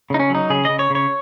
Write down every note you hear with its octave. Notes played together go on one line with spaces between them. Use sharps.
C#3 D#4
C#4
F#3 D#4
C#3 G#4
C#3 D#5
C#5
C#3 C#5